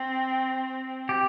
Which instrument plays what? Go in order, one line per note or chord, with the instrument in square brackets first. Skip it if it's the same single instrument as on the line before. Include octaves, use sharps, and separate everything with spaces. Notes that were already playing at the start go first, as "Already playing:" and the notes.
Already playing: [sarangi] C4
[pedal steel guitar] G4